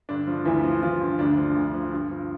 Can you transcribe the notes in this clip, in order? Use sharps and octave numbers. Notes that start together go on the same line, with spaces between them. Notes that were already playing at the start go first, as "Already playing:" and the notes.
G2 D3 D4
F3
D2 E3 E4
F3
E3 F3 F4
G2
D2 D3 D4
F3
D2
F3
G2
F3